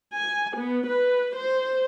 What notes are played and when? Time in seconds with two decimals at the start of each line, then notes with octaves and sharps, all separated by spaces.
0.15 G#5
0.56 B3
0.87 B4
1.37 C5